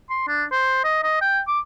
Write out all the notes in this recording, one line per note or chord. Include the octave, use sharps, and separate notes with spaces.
C6
D4
C5
D#5
D#5
G5
D6